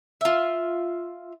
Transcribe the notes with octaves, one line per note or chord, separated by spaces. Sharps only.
F4 E5